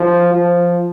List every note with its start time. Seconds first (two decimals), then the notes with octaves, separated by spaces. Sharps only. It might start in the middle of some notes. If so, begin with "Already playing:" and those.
Already playing: F3
0.33 F3